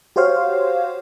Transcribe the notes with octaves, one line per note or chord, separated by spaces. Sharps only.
F#4 G4 C5 C#5 F5